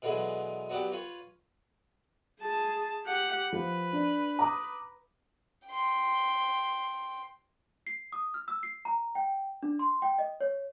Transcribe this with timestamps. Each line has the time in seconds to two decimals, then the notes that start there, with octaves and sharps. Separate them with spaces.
0.02 B2 D3 E3 F#3 G#3
0.69 F#3 B3 D4 F#4 G4
0.92 F4 B4 C#5
2.40 G#4 A5
3.05 G4 F#5
3.52 F3 B4
3.93 D4
4.39 A#5 D6 D#6
5.68 G5 C6
7.87 C7
8.13 D#6
8.34 F6
8.48 E6
8.63 C7
8.85 A#5
9.15 G5
9.63 D4
9.79 C6
10.02 G5
10.19 D#5
10.41 C#5